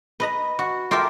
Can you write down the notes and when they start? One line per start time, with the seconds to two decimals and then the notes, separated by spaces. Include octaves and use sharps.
0.20 B4 D#5 A#5
0.59 F#4
0.91 F4 G4 A4 A#4 E5